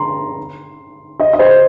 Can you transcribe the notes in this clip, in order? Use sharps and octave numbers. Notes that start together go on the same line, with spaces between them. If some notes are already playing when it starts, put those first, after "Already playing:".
Already playing: A#5 C6
D#5
D#5
C5